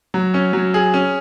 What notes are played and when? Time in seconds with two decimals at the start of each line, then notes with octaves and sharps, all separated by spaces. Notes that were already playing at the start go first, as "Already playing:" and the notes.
0.14 F#3
0.34 C#4
0.53 F#3
0.74 G#4
0.94 C#4